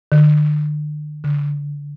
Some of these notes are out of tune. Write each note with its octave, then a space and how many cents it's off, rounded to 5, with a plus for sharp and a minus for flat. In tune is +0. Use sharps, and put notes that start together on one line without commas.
D3 +40
D3 -20